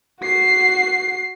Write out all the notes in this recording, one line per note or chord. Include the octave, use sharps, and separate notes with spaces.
F#4 C7